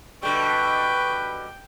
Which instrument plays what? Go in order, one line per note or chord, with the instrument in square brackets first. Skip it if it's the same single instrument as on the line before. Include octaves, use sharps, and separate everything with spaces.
[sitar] B2 D3 G3 [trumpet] B4 [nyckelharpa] G5 [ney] C#6